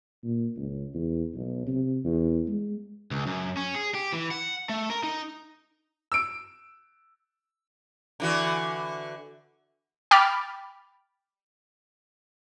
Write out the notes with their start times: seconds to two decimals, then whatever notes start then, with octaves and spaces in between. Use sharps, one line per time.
0.23 A#2
0.57 C#2
0.94 E2
1.34 B1
1.67 C3
2.04 E2
2.48 G#3
3.11 C#2
3.27 F#2
3.57 C#4
3.75 G#4
3.95 G4
4.12 E3
4.31 F#5
4.69 A3
4.90 A#4
5.03 D#4
6.12 E6 D7
8.20 D3 E3 F#4
10.11 G5 B5 D6 F6 A6